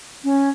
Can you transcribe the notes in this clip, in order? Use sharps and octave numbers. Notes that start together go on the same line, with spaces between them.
C#4